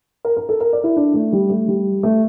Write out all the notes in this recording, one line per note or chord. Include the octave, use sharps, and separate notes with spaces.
A#4
A#4
A4
A#4
D5
E4
D4
A3
G3
A3
G3
A3